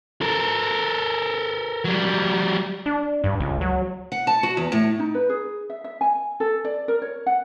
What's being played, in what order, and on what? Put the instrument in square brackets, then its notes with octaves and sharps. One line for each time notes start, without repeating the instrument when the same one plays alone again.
[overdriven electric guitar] A4 A#4
F#3 G3
[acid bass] D4
G2
C#2
F#3
[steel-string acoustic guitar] F#5
A5
F#4
E2
A2
[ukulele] D#4
B4
G#4
E5
E5
G#5
A4
D5
A#4
C#5
F#5